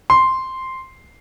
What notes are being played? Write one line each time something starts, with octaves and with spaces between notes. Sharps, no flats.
C6